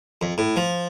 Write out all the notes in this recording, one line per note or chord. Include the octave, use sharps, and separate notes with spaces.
F2
A2
F3